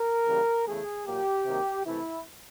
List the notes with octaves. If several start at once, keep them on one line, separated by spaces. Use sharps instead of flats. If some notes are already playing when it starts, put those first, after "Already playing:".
Already playing: A#4
C#3 E3 G3 A#3
E2 C#3 E3 A3 G#4
A#2 F#3 A#3 G4
C3 D#3 F#3 A#3
C3 E3 A3 E4